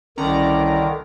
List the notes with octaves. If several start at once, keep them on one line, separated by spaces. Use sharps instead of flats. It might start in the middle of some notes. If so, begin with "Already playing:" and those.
C2 D3 D#3 C#4 D5 A#5